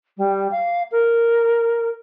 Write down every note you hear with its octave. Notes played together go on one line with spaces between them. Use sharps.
G3
F5
A#4